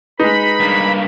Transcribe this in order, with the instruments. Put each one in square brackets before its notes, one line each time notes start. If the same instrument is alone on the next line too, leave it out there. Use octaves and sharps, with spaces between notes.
[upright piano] G#3 D#4 [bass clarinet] B4 [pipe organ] B5
[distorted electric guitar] G2 A#3